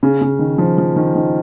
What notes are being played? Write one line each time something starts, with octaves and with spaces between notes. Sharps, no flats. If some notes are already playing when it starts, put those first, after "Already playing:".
C#3
C#3
D#3
F3
F3
D#3
D#3